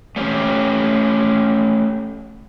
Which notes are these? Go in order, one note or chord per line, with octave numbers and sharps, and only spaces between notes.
A3 C#4 G4